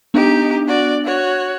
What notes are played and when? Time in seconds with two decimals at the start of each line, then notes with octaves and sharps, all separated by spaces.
0.14 B3 D4 D#4 G4
0.67 F#4 D5
1.05 F#4 C#5